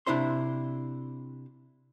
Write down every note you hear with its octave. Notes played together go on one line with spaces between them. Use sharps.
C3 D4 E4 C5 C6